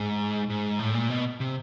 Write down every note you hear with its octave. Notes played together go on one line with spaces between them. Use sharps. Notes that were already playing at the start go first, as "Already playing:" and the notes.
Already playing: G#2
G#2
A2
A#2
B2
C3